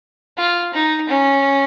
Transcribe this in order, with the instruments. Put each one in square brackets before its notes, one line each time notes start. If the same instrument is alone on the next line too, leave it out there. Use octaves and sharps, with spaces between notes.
[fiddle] F4
D#4
C#4